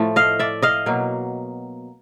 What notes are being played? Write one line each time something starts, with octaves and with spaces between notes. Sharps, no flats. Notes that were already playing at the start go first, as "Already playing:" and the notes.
Already playing: A2 F3 A3
D#5 F5
D5 E5
D#5 F5
B2 F#3 A#3